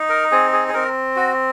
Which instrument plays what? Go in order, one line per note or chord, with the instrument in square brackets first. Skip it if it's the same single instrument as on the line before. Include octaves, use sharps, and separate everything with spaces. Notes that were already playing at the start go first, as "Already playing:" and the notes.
Already playing: [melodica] D#4
A#4
C4 G#4
G#4
G#4
C4 A#4
F#4